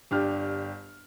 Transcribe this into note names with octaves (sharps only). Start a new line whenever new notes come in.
G1 D4 G4 F6